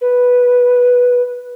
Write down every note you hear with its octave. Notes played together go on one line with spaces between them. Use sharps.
B4